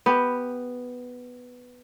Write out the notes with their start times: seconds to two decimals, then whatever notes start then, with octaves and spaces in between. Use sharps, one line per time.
0.06 B3 G4